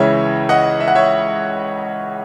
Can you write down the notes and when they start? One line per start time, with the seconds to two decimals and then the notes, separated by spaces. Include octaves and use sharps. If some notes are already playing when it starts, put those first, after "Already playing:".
Already playing: C#2 C#3 E3 C#5 E5
0.49 D#5 F#5
0.80 E5
0.88 F#5
0.95 C#5 E5